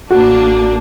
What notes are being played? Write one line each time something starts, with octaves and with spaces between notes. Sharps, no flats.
A1 A#3 D4 F#4